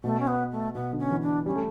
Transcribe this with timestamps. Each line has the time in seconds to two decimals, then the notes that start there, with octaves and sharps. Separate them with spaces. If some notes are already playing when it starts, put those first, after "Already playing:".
0.04 B2 A3
0.19 C#4
0.27 B3
0.52 A3
0.75 B2 B3
0.93 D3
0.99 C#4
1.11 E3
1.22 D4
1.46 G3 C#4
1.56 A3